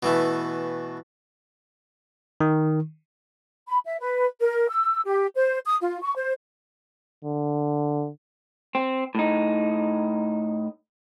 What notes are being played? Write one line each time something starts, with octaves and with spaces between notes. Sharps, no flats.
B2 E3 A3
D#3
B5
E5
B4
A#4
E6
G4
C5
D#6
F4
C#6
C5
D3
C4
A2 D#4